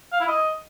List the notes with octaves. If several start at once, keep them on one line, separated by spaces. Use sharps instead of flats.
F5
E4
D#5